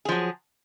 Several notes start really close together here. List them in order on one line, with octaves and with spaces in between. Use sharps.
G#4 F3 F#3